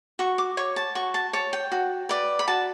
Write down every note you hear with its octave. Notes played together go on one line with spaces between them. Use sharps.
F#4 C#6
D6
C#5 C#6
A5
F#4 C#6
A5
C#5 A5
G5
F#4
B4 D5
B5
F#4 A5